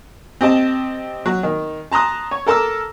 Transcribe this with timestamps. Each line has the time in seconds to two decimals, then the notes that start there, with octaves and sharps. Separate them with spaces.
0.41 C4 G4 D#5 A5
1.26 F#3
1.43 D#3
1.92 A5 A#5 C6 D#6 F#6
2.31 C#5
2.47 A4 A#4 A5 D6 E6